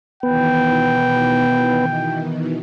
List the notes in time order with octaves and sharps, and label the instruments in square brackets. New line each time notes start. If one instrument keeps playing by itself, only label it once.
[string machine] B2 D#3 E3 [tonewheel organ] B3 [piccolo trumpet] G5